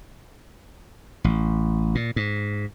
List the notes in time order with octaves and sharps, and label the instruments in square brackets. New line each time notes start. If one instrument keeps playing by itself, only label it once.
[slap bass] A1
A#2
G#2